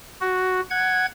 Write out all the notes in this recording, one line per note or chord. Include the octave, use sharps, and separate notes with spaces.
F#4
F#5 G#6